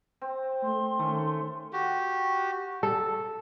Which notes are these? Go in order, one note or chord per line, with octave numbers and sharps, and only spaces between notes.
C4
A3 C6
D#3 A3 C#4
F#4 G4
A4